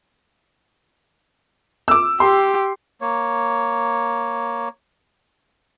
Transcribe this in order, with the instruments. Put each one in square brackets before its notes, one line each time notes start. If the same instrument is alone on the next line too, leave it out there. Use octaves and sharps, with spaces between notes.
[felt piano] D6 E6
[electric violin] G4 [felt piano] C6
[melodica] A#3 C#5